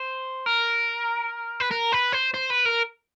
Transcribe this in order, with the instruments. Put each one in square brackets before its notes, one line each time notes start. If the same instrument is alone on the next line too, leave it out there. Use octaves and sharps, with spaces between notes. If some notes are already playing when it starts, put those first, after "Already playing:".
Already playing: [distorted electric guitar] C5
A#4
B4
A#4
B4
C5
C5
B4
A#4